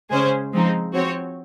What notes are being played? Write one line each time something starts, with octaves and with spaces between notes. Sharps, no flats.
C#3 G#3 C#4 G#4 C5
F3 G#3 C4 D#4
F3 C4 F#4 C#5